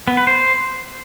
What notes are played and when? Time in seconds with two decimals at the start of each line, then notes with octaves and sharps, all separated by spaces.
0.08 B3
0.17 B4
0.27 C5